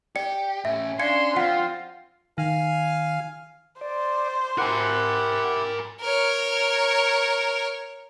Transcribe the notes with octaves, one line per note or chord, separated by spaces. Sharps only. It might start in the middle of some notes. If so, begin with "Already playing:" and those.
G4 D5 C#7
A2 C#4 E5
C#4 D4 F5 C6 G#6 C#7
F3 C4 F4 F#5
D#3 F5 G#5 F6
C5 D5
E4 G4 A#4 F#5 G#5
A#4 C#5